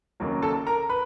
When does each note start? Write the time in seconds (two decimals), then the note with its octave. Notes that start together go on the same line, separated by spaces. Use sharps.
0.20 F1 D#2 C#3 F#3 A#3
0.42 A4 A5
0.67 A#4 A#5
0.89 B4 B5